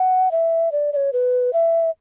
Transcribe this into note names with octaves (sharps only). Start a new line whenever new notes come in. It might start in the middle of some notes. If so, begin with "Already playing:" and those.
Already playing: F#5
E5
D5
D5
C#5
B4
E5